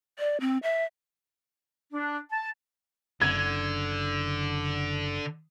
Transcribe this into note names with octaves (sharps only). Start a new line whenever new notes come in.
D5
C4
E5
D4
A5
F#1 D3 G#6